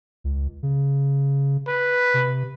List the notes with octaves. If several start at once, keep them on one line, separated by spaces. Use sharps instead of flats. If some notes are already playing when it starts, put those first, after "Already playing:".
C#2
C#3
B4
C3